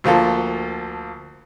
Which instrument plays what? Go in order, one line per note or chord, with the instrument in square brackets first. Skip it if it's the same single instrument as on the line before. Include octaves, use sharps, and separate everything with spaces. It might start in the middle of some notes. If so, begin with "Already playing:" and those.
[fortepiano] D2 F3 A#3 A4